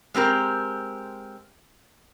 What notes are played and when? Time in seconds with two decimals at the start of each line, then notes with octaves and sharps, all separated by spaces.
0.14 G#3 C4 G4 A#4